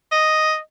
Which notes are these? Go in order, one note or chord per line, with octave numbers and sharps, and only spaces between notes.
D#5